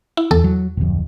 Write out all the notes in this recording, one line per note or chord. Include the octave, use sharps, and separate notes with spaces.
E4
E2 A4
F#3
D1 F2